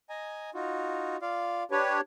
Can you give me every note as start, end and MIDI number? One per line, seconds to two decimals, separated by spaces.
0.10 0.50 75
0.10 0.50 80
0.10 0.50 82
0.54 1.17 63
0.54 1.17 65
0.54 1.17 66
1.22 1.63 65
1.22 1.63 74
1.22 1.63 77
1.71 2.01 62
1.71 2.01 67
1.71 1.97 71
1.71 2.01 73